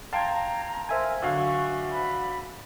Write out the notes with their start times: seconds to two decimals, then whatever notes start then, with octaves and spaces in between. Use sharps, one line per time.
0.13 F5 G5 A5 A#5 C6 G#6
0.89 A#4 C5 E5 G#5
1.22 D3 F#3 F5 C#6
1.91 B5